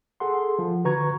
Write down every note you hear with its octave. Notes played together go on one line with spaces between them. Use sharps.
G#4 A4 F#5 C6
F3
D3 F#4 B4 A#5 C#6 G#6